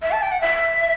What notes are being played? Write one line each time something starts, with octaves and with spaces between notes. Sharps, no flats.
E5
A5
G5
F#5
E5